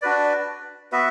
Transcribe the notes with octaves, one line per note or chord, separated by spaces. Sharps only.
D4 F#4 B4 D5
B3 F#4 B4 E5